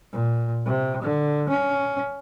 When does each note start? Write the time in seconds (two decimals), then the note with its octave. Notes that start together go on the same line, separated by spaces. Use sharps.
0.12 A#2
0.65 C3
1.02 D3
1.49 C#4